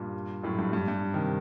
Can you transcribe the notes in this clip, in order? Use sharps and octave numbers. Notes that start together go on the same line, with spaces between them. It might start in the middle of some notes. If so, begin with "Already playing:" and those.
Already playing: G2 A#2
F#2 A2
G2
G2
G2
C3 D#3